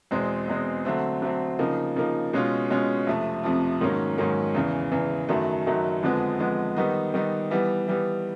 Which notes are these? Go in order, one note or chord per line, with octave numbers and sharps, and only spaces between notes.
E2 B2 G#3 C4
E2 B2 G#3 C4
D3 F#3 A3 C4
D3 F#3 A3 C4
C#3 F3 A#3 D#4
C#3 F3 A#3 D#4
B2 G#3 C#4 F4
B2 G#3 C#4 F4
F2 C3 F3 A3
F2 C3 F3 A3
G#2 D#3 F#3 A#3 C#4
G#2 D#3 F#3 A#3 C#4
E2 C#3 E3
E2 C#3 E3
F#2 D#3 F#3 A3
F#2 D#3 F#3 A3
F2 D3 F3 G#3 B3
F2 D3 F3 G#3 B3
D#3 G3 B3 D#4
D#3 G3 B3 D#4
E3 G3 B3
E3 G3 B3